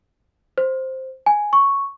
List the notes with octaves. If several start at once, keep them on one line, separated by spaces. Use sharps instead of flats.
C5
G#5
C#6